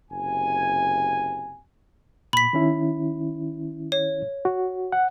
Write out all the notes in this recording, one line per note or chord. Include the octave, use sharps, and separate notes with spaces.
F#1 C3 G#5
A#2 B5 B6
D#3 C#4 E4
C#5
F#4
F#5